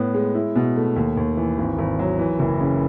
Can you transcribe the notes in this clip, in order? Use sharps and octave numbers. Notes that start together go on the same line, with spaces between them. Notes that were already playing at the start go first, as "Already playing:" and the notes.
Already playing: A2 B3
G#3
E4
B2
A3
D#2
D#2
E3
G#1
G#1
F#3
E3
F#1
C#3